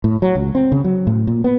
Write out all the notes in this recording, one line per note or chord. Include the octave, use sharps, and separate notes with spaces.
A2
F#3
C#2
C4
C#3
F#3
A2
A#2
B3